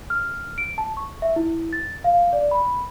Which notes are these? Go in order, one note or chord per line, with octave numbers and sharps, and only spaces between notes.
F6
D7
A5
C#6
E5
E4
A6
F5
D5
B5